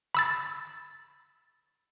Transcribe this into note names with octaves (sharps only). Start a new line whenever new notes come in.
B5 E6 A6